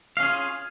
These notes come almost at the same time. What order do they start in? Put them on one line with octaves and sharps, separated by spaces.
F5 C#4 G#4 F4